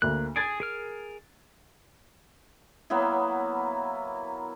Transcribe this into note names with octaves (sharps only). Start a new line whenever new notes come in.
D2 A#3 F#6
G#4 G#6 A6 D7
G#4 A#4 F6
F#3 A#3 B3 E4